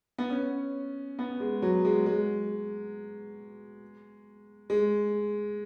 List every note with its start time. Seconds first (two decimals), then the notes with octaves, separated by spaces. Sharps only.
0.18 B3
0.30 C#4
1.19 B3
1.40 G#3
1.62 F#3
1.85 G#3
2.06 G#3
4.70 G#3